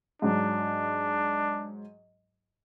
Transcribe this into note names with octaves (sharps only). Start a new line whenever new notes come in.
G#2 F#3 D4